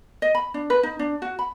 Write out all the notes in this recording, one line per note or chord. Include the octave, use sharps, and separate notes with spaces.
D#5
B5
D4
B4
D#4
D4
F#4
B5